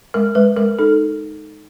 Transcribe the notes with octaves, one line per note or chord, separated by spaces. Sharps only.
G#3 A#4
G#3 B4
G#3 A#4
D#4 A4